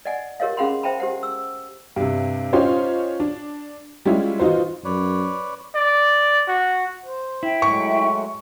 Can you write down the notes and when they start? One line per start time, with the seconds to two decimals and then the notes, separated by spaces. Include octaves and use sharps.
0.05 D5 D#5 F#5 G#5
0.40 G4 A#4 C#5 D#5 F5
0.57 C#4 G#4 F5 F#5 B5 C6
0.83 C5 E5 G5 A5 B5
1.00 G4 C5 F#5
1.23 E6
1.96 G2 C3
2.53 C#4 D#4 F4 G4 C5 C#5
3.20 D4
4.06 G3 G#3 C#4 E4 F4
4.39 E3 D#4 F4 F#4 C5
4.85 F#2 B4 C#5 D5
5.75 D5
6.48 F#4
7.05 C5
7.43 E4 E5 G5
7.62 F#3 G#3 A3 C#6